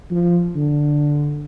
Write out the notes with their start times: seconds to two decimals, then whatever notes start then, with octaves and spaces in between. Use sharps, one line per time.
0.11 F3
0.55 D3